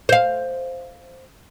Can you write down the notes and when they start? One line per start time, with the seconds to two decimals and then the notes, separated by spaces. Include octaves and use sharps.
0.09 C5 F5